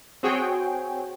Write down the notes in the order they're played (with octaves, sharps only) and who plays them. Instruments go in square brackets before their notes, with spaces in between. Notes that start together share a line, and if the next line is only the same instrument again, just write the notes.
[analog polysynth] C4 F#4 G#4 C#5 G5